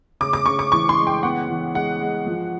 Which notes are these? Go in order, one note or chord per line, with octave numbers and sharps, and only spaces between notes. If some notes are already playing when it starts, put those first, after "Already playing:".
C#3 D6
D6
C#3 C#6
D6
E3 C#6
C6
G#3
G5
B3 F#5
E3
G#3 F#5
G#3
F3